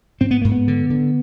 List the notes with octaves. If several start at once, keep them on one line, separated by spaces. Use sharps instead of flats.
G#2 C4
B3
G#2 A#3
B3
D3
D3